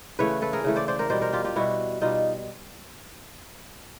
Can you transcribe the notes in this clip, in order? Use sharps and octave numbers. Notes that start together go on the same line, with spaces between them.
C#3 E3 A3 B4 C#5
A4 B4
G#4 A#4
C#3 E3 A3
C5 D5
C5 D5
A#4 C5
B2 G3 C5 D5
A#4 C5
F4 G4
F4 G4
B2 G3 E4 F#4
B2 G3 D#4 F4